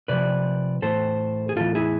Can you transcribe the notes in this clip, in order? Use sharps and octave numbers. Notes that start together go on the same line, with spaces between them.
C3 F3 B4 D5
A2 E3 A4 C5
G#4
A2 E3 F4 A4
E4 G#4